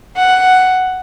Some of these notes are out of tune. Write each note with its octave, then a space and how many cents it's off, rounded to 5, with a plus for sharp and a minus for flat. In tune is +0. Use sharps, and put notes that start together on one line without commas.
F#5 +5